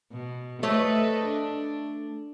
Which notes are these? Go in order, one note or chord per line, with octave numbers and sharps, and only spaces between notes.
B2
A3 A4 B4 C#5 D#5
D4